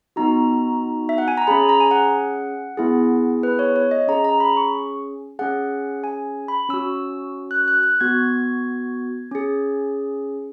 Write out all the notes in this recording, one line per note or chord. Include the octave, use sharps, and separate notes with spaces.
B3 D#4 F#4 A#5
E5
F#5
G#5
A#5
C#4 G#4 B5
A#5
G#5
F#5
B3 E4 G#4
B4
C#5
C#5
D#5
C#4 G#4 A#5
A#5
B5
C#6
C#4 G#4 F#5
G#5
B5
C#4 F#4 E6
F#6
F#6
F#6
B3 F#4 G#6
C#4 G#4